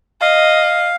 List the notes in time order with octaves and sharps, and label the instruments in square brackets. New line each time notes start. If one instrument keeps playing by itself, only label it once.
[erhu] D#5 [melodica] F5